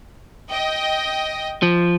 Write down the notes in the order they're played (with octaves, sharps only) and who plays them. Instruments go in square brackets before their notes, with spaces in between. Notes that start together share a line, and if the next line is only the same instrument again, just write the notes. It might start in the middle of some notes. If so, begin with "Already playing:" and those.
[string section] D#5 G5
[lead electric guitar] F3